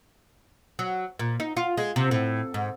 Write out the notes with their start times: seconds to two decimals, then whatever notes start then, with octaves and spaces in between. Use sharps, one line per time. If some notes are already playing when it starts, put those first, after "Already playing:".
0.79 F#3
1.19 A#2
1.40 D#4
1.57 F4
1.77 G#3
1.96 C3
2.11 A2
2.54 G#2